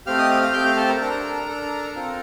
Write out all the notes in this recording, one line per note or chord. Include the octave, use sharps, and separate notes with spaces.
A3 C4 G4 F5 F6
D#5 D#6
F5 F6
F5 F6
A3 C4 G4 G5 G6
F5 F6
A4 A5
A#4 A#5
D4 A4 A#4 A#5
D4 A4
C4 F4 A4